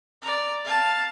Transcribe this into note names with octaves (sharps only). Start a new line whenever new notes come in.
D5 A#5
F5 A5